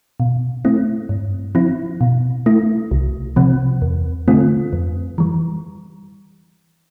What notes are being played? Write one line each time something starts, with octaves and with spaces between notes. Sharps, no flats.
B2
A3 C4 E4
G2
F3 C4 E4
B2
A3 E4
C2
C3 F3 C4
E2
D3 A3 C4 F4
F2
E3 G3